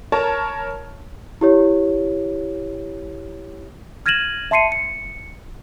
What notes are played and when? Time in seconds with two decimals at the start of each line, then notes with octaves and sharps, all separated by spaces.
0.12 A#4 C#5 A5 A#5
1.41 E4 G4 C#5
4.06 F6 G#6 A#6 D#7 E7 F#7
4.51 E5 A5 C6 C7 C#7 D#7
4.72 C#7